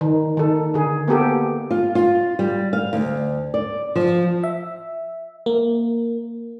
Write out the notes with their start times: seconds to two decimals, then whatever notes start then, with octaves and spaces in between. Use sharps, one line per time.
0.01 D#3
0.37 D#3 A4
0.74 D3 G#4
1.08 A#3 B3 G4 A4
1.71 F4
1.95 F4
2.39 G3
2.73 F5
2.93 D2
3.54 D5
3.96 F3
4.44 E5
5.46 A#3